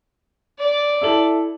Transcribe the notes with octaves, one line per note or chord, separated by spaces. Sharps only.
D5
E4 A4 F#7